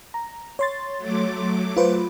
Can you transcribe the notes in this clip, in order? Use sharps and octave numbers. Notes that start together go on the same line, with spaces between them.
A#5
C#5 C6 A6
F#3 A3 D6
F4 B4 C5